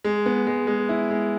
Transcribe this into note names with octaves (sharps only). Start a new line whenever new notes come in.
G#3
B3
G#3
G#3
E4
G#3